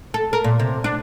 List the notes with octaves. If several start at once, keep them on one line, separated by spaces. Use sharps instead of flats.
A4
A#4
A#2
C3
D4